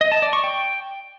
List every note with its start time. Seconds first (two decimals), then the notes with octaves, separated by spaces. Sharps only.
0.01 D#5
0.12 A5
0.22 D5
0.33 C#6
0.44 G5